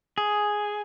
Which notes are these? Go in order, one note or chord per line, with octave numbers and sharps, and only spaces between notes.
G#4